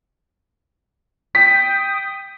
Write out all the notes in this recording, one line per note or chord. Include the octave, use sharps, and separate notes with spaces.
G5 D#6 B6